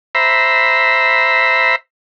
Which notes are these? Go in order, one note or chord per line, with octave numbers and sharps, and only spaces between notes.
C5 E5 A#5 B5